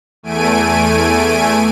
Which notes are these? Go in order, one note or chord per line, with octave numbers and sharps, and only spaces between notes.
E2 A3 G#5 D7 D#7